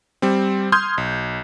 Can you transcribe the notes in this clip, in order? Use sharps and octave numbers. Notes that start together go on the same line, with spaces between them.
G3 C4
C6 D#6 F6 G6 G#6
B1